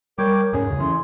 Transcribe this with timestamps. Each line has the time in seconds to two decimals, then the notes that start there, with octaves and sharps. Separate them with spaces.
0.18 G3 A#4 C#5 G5 D6
0.53 C#2 G#2 C#4 G#4
0.67 E2 C#3
0.80 E3 C#4 C6